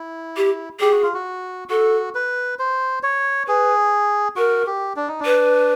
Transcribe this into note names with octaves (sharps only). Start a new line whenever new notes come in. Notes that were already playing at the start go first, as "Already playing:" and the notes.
Already playing: E4
G4
G4 G#4
F#4
F4
F#4
F#4 A4
B4
C5
C#5
G#4 B4
F#4 A#4
G4
D4
D#4
D4
B4